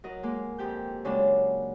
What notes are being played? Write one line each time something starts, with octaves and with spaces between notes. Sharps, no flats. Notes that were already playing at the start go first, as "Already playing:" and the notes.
F#3 A#4 D#5
G#3 A#3
F2 G4 G6
C#3 F#3 G#3 A#3 D4